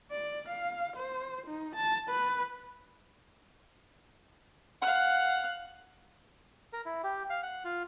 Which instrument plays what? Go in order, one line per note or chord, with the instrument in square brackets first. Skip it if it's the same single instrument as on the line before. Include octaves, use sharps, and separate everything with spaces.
[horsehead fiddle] D5
F5
C5
D#4
A5
B4
[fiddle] F5 F#6 [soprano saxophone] F#5
[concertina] A#4
E4
G4
F5
F#5
F4